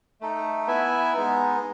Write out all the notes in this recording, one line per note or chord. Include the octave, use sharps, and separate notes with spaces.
A3 D#4 A4
B3 E4 B4 E5 G#5
G#3 B3 D#4